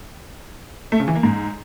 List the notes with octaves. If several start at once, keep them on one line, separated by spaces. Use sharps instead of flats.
A3
C#3
E3
A#3
G#2